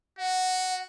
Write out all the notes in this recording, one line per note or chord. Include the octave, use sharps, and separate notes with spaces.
F#4 F#5